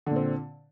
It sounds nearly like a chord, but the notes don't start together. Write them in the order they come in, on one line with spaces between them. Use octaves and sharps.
D3 A#2 C4